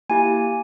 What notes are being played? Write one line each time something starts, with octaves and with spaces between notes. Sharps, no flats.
A#3 E4 G4 G#5